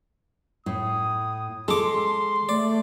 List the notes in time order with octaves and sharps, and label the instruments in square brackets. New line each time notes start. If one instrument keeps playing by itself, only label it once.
[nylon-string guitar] A2 [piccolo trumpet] D#6
[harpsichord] G#3 D6 [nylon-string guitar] A4 [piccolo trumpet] C6
[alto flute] A3 [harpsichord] D5